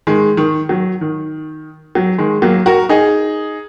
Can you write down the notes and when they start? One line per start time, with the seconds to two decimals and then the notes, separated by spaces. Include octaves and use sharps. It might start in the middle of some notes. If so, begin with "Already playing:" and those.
0.07 D#3 G#3
0.37 D#3
0.69 F#3
1.01 D#3
1.95 F#3
2.18 D#3 G#3
2.42 F#3 A#3
2.66 F#4 A#4
2.89 D#4 G#4